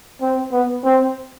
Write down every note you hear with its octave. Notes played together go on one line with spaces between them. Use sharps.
C4
B3
C4